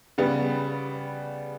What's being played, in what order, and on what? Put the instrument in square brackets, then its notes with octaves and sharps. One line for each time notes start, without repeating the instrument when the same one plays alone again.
[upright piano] C#3 G3 B3